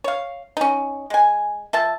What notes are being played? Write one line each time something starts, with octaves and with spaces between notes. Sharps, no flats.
C#5 F5
C#4 D#4
G#3 G#5
F3 E5 A5